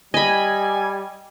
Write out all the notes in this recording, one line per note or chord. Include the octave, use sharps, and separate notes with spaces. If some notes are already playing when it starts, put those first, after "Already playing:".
G3 D#5 G#5 B5